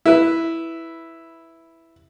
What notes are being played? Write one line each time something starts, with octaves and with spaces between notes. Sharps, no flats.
E4 B4